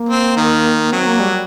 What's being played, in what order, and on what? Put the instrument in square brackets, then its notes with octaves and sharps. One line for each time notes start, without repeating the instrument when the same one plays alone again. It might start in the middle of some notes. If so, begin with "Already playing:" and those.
Already playing: [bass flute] A#3
[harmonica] C4
D#3
[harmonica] F#3 [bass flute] C4
[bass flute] A#3
G3